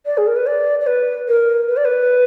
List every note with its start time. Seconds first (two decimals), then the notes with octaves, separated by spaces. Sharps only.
0.06 D5
0.17 G#4
0.27 A#4
0.36 B4
0.47 D5
0.80 D5
0.87 B4
1.28 A#4
1.68 B4
1.77 D5
1.85 B4